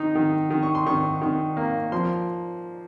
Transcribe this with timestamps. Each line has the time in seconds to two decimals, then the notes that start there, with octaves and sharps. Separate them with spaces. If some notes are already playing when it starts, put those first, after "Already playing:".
Already playing: D#3 D#4
0.15 D#3
0.50 D#3
0.63 C#6
0.75 C6
0.86 D#3 C#6
1.22 D#3
1.57 A#3
1.92 F3 C6